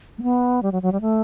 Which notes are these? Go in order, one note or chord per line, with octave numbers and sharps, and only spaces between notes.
A3
B3
G3
F#3
F#3
G3
A3